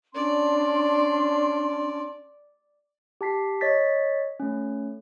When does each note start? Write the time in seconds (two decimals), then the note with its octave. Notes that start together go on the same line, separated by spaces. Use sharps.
0.15 C#4 D4 D5 C6
3.21 G4 A5 B6 C7
3.61 C#5 D#5 A6 B6
4.40 A3 C#4